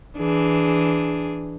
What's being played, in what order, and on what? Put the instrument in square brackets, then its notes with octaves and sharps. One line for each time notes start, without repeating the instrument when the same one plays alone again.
[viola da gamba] E3 D4 G#4